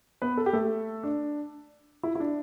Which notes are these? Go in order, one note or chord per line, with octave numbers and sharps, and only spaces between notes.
B3 B4
A4
G4
A3 A4
D4
E4
E4
D4